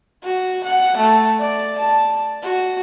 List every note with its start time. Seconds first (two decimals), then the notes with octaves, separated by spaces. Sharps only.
0.24 F#4
0.64 F#5
0.98 A3
1.40 D5
1.78 A5
2.42 F#4